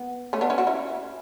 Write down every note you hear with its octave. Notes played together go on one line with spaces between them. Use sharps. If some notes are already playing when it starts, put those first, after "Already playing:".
Already playing: B3
A3 C#4
B3 D4
C#4 E4
D4 F#4
C#4 E4